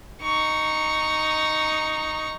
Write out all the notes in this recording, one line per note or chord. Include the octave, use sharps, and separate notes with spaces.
D#4 C#6